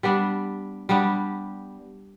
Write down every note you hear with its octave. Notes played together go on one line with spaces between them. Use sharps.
G3 B3 D4
G3 B3 D4 G4